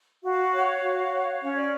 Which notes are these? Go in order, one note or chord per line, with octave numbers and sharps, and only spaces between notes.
F#4 F5
C#5
F#4
C#5
C#4 C#5
D5